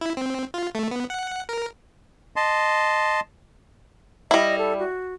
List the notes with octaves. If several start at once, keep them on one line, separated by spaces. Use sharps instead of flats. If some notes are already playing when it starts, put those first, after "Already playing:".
E4
C4
F4
A3
B3
F#5
A#4
D#5 A5 C6
G3 E4 D#5
A4
F#4